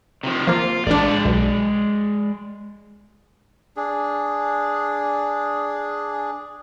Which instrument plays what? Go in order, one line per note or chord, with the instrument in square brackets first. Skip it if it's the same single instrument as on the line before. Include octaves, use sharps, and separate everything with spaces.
[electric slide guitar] C3 D#3 F3
[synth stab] F3 A#3 [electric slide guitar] F4
[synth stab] A1 D4 [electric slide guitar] G#3 D5
[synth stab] B1
[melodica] D4 G#4